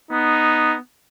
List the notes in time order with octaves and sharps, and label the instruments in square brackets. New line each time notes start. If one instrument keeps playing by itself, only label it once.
[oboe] B3 [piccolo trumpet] D#4